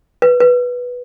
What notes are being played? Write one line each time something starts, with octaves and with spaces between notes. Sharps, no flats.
B4
B4